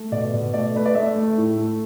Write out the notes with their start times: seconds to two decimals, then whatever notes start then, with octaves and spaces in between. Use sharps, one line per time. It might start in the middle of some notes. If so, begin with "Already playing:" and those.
Already playing: A3
0.12 B2 D5
0.33 B2
0.54 A3 D5
0.75 A3 B4
0.85 D5
0.95 A3 E5
1.16 A3
1.38 A2
1.58 A3